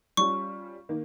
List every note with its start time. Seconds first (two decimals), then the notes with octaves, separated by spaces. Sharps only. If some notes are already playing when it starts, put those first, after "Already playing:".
0.17 G3 C#4 F4 C#6
0.89 D#3 A#3